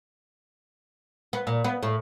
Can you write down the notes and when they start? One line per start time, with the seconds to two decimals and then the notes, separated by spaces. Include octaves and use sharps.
1.33 B3
1.47 A#2
1.64 B3
1.83 A2